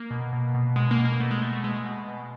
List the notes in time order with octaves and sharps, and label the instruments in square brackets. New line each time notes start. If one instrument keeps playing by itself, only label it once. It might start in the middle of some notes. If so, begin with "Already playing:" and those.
Already playing: [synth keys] A#3
B2
B2
B2
B2 G#3
A#3
B2
A#3
B2 A3
G#3
B2 A3
A3
B2 G#3
B2
B2